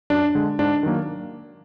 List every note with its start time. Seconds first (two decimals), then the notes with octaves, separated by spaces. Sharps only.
0.10 F#2 D4
0.35 D3 G#3
0.59 G#2 D4
0.83 D#3 F#3 A#3